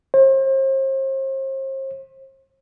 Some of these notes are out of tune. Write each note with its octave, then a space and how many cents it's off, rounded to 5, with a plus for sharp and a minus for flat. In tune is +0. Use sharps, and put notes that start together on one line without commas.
C5 +40